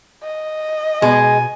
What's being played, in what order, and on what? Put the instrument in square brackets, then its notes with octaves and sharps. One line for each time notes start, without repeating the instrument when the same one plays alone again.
[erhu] D#5
[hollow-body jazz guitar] B2 [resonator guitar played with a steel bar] G#3 [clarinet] G#5